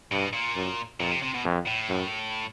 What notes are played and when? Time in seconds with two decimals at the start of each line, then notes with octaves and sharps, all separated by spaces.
0.12 G2 B2
0.33 A#2
0.56 F#2
1.00 F2 A#2
1.11 C3
1.22 C3
1.34 B2
1.45 F2
1.66 A2
1.89 F#2